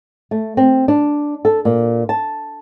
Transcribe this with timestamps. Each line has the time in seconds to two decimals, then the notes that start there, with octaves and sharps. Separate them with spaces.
0.31 A3
0.57 C4
0.88 D4
1.45 A4
1.65 A#2
2.09 A5